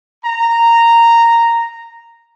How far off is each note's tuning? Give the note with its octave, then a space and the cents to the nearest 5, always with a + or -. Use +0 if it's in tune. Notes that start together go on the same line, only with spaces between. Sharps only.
A#5 -10